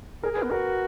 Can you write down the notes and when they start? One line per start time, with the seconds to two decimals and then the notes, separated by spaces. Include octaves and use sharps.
0.22 G#4 A#4
0.33 G#4
0.37 B4
0.43 B3
0.51 F#4 A#4